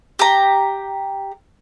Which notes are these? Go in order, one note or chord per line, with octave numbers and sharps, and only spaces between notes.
G4 A#5